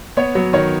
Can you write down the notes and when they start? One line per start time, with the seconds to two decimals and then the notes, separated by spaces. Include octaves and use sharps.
0.17 B3 C#5
0.35 F#3 B3
0.53 D#3 C#5